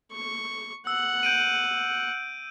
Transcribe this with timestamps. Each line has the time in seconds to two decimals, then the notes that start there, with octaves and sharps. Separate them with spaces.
0.12 C#6
0.87 F#5 E6
1.23 G6 D7 D#7